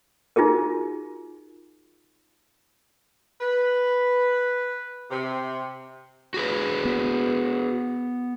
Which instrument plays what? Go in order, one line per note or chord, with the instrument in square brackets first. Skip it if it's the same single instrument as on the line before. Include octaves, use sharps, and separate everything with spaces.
[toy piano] D#4 F4 F#4 G#4 A#4
[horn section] B4
C3
[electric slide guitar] F#4 G#4 B4
[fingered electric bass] B3